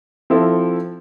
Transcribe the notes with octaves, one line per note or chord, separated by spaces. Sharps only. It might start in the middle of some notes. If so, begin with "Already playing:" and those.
F3 C4 E4 A4